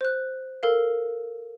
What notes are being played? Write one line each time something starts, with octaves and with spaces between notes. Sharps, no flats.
C5 F#6
A4 A#4 F5